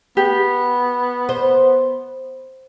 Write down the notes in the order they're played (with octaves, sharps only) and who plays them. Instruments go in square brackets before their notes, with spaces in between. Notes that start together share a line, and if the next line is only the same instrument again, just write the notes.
[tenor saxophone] B3 [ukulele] G4
[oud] C5